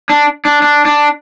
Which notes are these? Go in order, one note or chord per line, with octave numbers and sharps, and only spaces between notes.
D4
D4
D4
D4